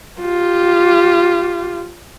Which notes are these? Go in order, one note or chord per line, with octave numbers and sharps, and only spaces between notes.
F4 G4